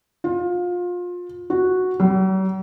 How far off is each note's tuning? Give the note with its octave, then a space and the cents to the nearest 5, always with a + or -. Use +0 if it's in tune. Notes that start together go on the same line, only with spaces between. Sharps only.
F4 +25
F#4 -5
F#3 +45